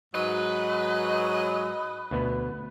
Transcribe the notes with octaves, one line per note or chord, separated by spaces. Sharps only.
G#2 F#3 B4 D#5
D2 B2 B3